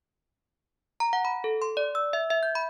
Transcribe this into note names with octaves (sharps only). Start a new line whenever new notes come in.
A#5
F#5
B5
A4
C6
D5
E6
E5
E5
G6
B5